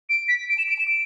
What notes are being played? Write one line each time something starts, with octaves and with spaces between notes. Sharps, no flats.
D7
B6
D7
E7
D7
E7
D7